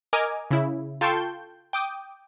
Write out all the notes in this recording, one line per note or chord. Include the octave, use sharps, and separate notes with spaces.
A#4 D#5 G#5 D6 D#6 F6
C#3 E4
F4 A4 G5 A5 C6 C#6
G6
G5 D6 D#6